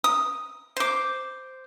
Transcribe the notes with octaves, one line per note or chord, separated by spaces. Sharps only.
D#6
C5 D6